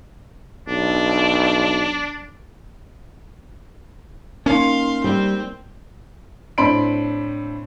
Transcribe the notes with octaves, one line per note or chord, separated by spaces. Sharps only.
B1 D4
A#3 C#4 D#4 A#4 F5 C6
G3 C4
A2 C4 D4 B5 C6 D7